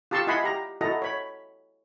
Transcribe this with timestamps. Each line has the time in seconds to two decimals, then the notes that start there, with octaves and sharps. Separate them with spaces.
0.11 F4 G4 A5 C6 C#6 E6
0.27 E4 D#5 F#5 G#5 B5 C6
0.44 G4 A#5
0.81 E4 F#4 A4 D#5 A#5
1.02 C#5 B5